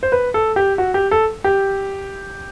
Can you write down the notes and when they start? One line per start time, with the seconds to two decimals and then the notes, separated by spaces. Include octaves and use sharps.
0.03 C5
0.12 B4
0.34 A4
0.56 G4
0.78 F#4
0.94 G4
1.11 A4
1.44 G4